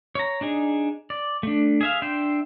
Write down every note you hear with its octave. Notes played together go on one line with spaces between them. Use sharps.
C#5 A#5
D4 D#4 G#4
D5
A3 D4
G#4 E5 F5
D4 E5 G5 C6